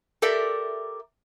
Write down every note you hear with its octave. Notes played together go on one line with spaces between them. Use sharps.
G4 A4 A#4 D5 E5